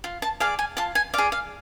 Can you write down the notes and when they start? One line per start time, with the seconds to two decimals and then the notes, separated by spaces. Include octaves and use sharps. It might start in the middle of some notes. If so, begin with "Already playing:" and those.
0.04 F4
0.22 A5
0.40 G#4 D5 F5
0.59 G#5
0.77 F4 A5
0.95 G#5
1.14 G#4 D5 F5
1.32 F5